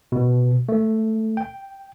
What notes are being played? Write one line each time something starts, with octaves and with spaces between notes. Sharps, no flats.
B2
A3
G5